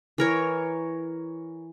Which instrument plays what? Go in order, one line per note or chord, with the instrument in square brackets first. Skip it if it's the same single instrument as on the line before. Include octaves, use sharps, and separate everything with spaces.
[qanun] E3 A#4 C#5